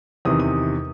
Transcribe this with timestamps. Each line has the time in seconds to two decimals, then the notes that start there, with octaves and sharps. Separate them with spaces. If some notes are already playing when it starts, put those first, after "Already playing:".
0.25 E2 C3 D#3 D#6
0.40 D#6